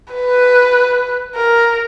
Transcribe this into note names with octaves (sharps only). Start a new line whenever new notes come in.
B4
A#4